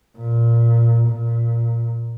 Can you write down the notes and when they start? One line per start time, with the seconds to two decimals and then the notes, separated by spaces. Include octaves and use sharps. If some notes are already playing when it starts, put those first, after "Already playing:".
0.18 A#2
1.09 A#2